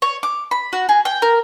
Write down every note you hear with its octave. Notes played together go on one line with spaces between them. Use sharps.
C#5
D6
B5
F#4
G#4
G5
A#4